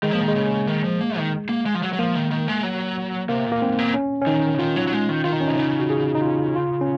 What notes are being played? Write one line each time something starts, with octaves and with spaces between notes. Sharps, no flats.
D#3 G#3
F3 A#3
D#3
G#3
C#3
D#3
F3
A#3
D#3
A#3
G#3
F3
F#3
F#3
F3 A#3
D#3
D#3
G#3
F#3
C3 A#3
A#2
A#3
G#2 C4
A#2
C#4
C#4
D#3 D#4
C#3
D#3 F4
F#3
F#3
G#3
D#3
D#3 F4
D#4
C#4
C3 D#4
C#3
F#4
G#4
D#4
F4
F4
C#4